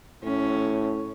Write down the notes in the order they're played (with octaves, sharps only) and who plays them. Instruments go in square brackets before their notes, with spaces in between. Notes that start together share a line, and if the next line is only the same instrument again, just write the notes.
[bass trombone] A2 [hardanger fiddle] C#4